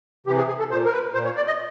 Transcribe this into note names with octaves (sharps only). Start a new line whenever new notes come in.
C3 E3 G4
G#4
G#4
A4
A#2 C5
A#4
B4
A#2 C5
C#5
D5
D#5